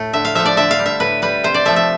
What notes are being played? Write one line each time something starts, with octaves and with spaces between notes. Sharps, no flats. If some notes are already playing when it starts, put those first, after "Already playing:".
Already playing: A2 A3
D3 E5
F5
F3 A3 E5
D5
D3 E5
F5
G3
E5
A2 B4
G3 B4
C3 C5
D5
F3 A3 E5
E5